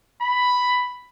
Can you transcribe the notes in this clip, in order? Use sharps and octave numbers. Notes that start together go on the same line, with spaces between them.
B5